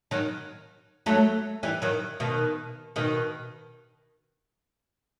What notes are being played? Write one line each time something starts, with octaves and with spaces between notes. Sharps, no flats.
D#3 F#3
F#3 A3
E3 G3
D#3 F#3
B2 D#3
B2 D#3